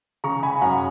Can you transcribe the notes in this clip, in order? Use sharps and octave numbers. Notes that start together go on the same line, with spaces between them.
C#3 A#5 C#6
G#5 B5
F#2 F#5 A#5